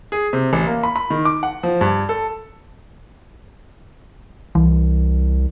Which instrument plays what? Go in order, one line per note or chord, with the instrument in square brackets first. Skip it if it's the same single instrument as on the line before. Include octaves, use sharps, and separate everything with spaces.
[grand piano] G#4
C3
A1
A#3
B5
B5
D#3
D6
F#5
F3
G2
A4
[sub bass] C2 [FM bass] E3